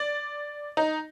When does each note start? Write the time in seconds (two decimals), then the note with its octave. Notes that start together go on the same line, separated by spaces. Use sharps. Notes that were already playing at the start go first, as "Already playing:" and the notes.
Already playing: D5
0.77 D#4